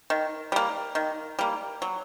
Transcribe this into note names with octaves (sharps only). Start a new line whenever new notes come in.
D#3
G3 A#3
D#3
G3 A#3
F#3